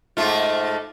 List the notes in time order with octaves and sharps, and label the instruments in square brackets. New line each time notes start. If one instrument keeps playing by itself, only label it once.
[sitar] G#2 A3 F4